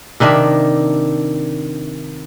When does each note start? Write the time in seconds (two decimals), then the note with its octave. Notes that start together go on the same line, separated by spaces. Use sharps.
0.20 C3 D#3 D4 E5